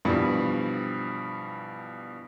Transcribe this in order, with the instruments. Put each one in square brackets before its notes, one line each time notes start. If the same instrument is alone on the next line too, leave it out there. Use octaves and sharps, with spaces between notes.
[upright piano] G2 B2 E3 F3 G3